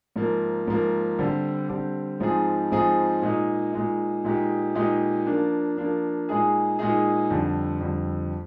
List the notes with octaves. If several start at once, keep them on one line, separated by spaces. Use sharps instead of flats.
G#2 F3 A#3
G#2 F3 A#3
D3 G3 C4 G4
D3 G3 C4 G4
G#2 F3 C4 D#4 G#4
G#2 F3 C4 D#4 G#4
A#2 G#3 D#4
A#2 G#3 D#4
A#2 G#3 D#4 G4
A#2 G#3 D#4 G4
F3 A#3 D4
F3 A#3 D4
A#2 G#3 D#4 G#4
A#2 G#3 D#4 G#4
F2 D3 G3
F2 D3 G3